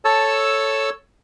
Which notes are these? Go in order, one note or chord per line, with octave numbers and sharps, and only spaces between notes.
A4 C#5 A5 E6